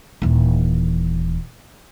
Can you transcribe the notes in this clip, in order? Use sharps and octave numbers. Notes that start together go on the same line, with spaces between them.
D#1 E3